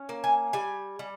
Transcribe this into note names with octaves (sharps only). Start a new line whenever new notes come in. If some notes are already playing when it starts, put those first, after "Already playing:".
Already playing: C#4
A#3
G#5
G3 G#5
G3